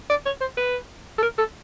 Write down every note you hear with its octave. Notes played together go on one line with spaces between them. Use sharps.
D5
C#5
C5
B4
A4
A#4
A4